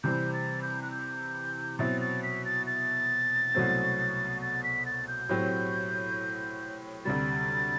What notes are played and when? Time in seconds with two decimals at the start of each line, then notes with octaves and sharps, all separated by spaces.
0.04 C3 E3 G3 C4 G6
0.33 A6
0.62 G6
0.82 F#6
0.91 G6
1.79 B2 F#3 C4 E4 A6
2.01 A6
2.23 B6
2.45 A6
2.67 A6
3.55 C2 B2 F#3 A3 C4
4.42 A6
4.64 B6
4.86 A6
5.08 G6
5.29 A2 F#3 C4 G4
7.05 D2 C3 G3 A6